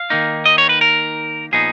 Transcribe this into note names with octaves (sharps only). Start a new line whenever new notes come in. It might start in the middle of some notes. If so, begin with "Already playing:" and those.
Already playing: F5
D#3 A#3 D#4
D#5
C#5
B4
A#4
A#2 F3 B3 D#4 G#4